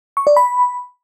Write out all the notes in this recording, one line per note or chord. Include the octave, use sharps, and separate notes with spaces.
C#6
D5
B5